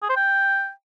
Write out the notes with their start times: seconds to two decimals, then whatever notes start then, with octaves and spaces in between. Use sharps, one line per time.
0.02 G#4
0.09 C5
0.16 G5